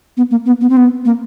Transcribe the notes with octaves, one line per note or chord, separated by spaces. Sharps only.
B3
A#3
B3
B3
C4
B3
A#3